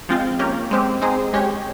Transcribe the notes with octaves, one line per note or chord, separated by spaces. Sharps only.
F3 G#3 C4 F4
A#3 C#4 G4 A#4
G#3 C4 G4
G#3 C4 D#4 G#4 C5
G#3 C#4 G4 C#5